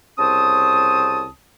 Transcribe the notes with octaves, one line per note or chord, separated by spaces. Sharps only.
C2 C#3 C4 C#4 A5 D#6